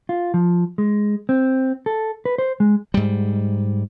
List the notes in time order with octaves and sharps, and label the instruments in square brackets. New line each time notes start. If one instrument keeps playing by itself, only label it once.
[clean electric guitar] F4
F3
G#3
C4
A4
B4
C5
G#3
[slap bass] G#2 G3